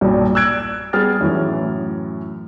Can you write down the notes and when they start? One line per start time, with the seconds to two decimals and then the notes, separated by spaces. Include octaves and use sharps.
0.01 B1 G2 A#2
0.35 E6 F#6 G#6 D7
0.93 G3 B3 G#4 F6 A6
1.21 F#2 A2 E3